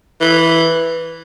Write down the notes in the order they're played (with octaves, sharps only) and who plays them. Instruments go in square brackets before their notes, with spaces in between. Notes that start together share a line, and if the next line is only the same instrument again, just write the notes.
[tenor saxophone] E3